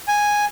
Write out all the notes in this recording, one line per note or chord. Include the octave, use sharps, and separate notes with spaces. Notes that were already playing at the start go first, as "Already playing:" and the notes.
G#5